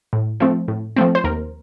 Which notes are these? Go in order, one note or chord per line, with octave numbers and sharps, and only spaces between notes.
A2
F3 A3 C4
A2
F3 A3 C4
C5
D#2 A#4